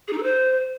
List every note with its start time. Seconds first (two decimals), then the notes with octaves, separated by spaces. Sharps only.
0.07 G#4
0.12 D#4
0.18 A4
0.23 C5